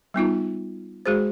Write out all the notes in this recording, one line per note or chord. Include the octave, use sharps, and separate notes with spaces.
G3 B3 D#4 F4
G#3 F#4 G#4 C5